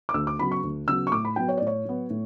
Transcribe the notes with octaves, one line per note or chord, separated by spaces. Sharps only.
D6
D2 E6
D6
C#3 F#3 B3 B5
C#6
D2
C#3 F#3 B3 E6
C#6
A2 D6
B5
F#3 B3 G5
C#5
D5
A2
C#5
F#3 B3
A2